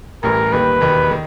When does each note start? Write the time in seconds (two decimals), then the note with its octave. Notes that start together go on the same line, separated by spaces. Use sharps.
0.23 A1 A2 E3 G3 A#4
0.52 D#2 D#3 G3 A#3 B4
0.81 E1 D#2 D#3
1.11 D#3